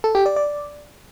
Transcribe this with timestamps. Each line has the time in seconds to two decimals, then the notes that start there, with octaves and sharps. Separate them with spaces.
0.04 A4
0.15 G4
0.26 D5
0.36 D5